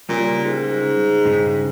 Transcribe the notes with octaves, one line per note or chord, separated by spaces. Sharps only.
A#2 C#3 G3
G#2
G2 C#3 D#4